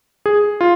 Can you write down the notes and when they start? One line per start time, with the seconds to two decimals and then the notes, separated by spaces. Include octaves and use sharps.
0.26 G#4
0.61 F4